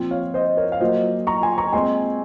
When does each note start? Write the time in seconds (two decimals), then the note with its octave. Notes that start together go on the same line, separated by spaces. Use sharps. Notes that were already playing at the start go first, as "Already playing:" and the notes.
Already playing: A#2 F3 C4
0.11 C#5 F5
0.34 C5 D#5
0.57 A#4 C#5
0.72 F5
0.80 A#2 F#3 A#3 C5 D#5
1.27 A#5 C#6
1.42 G#5 C6
1.58 A#5 C#6
1.73 A#2 G#3 C4 G#5 C6